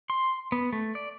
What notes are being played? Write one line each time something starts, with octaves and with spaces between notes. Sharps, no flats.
C6
B3
A3
D5